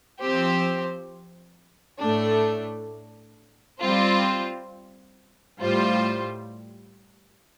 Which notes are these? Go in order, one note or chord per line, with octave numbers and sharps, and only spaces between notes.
F3 C4 G4 C5
A2 A3 D4
G3 C4 F4 C5
A2 G3 F4 C5